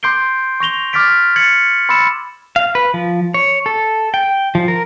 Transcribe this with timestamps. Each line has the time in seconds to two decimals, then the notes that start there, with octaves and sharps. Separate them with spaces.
0.03 C6 D6 G6 C7 D7 G7
0.60 C#6 A#6 F7 G7
0.93 D6 F6 A6 B6 D7
1.36 G#6 A6 C#7 F#7
1.89 B5 C6 E6 A6 C#7 E7
2.56 F5
2.75 B4
2.94 F3
3.34 C#5
3.66 A4
4.14 G5
4.55 F3
4.68 A#4